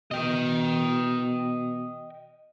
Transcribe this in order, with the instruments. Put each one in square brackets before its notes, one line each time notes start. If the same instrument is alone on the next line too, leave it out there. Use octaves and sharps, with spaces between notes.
[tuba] B2 [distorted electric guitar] D#5 G5